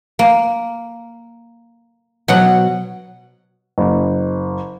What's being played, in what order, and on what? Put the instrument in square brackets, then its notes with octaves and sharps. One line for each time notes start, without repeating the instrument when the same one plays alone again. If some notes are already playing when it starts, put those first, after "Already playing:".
[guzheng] A#3
B2 F#3 F#5
[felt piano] F#1